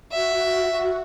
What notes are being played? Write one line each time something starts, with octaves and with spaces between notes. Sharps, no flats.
F#4 E5